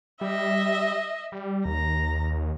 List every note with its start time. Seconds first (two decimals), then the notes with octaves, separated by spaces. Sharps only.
0.21 G3 D#5 E5
1.32 G3
1.66 D#2 A#5